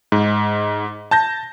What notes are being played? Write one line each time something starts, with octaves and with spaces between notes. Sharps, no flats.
G#2
A5 G6 A#6